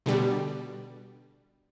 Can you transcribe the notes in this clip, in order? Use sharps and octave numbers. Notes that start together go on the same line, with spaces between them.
B2 D3 G3